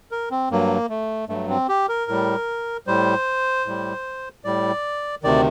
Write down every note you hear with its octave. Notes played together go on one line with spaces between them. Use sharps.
A#4
C4
G2 F#3 A#3
A3
G2 F#3 A3
C4
G4
A#4
A2 G3
A2 G3 C5
A2 G3
A2 G3 D5
D2 C3 D#3 D5